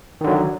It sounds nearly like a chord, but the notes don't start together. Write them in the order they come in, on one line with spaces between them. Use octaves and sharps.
D#3 D3 F#3